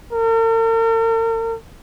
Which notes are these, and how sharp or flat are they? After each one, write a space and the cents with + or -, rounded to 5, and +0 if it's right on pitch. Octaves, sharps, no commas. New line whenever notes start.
A#4 -45